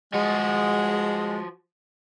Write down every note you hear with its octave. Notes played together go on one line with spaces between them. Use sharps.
F3 G#3 F#4